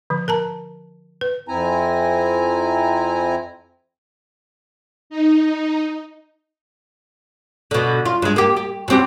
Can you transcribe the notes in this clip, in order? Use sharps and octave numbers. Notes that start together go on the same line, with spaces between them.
D3 F3
A#4 A5 A#5
B4
F2 C4 E4 G#5 A#5
D#4
B2 D3
F4
G2 G#3
A#3 G4
G4
B2 C4 G4